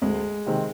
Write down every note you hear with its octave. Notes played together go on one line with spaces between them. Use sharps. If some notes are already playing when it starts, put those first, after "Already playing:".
D2 G#3
C3 D#3 G#3 C4